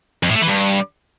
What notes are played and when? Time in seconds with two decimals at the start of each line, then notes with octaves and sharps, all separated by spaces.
0.23 F2
0.29 A2
0.35 A3
0.42 E3
0.48 G2